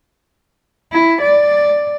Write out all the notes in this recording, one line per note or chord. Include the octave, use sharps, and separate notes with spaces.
E4
D5